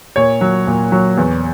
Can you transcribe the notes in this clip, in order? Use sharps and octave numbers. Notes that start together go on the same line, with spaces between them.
A#2 C#5
F#3
A#2
F#3
E2